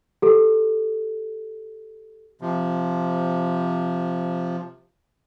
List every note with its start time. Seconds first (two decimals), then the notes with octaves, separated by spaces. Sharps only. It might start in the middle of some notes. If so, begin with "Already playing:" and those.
0.22 G4 A4
2.41 C3 F3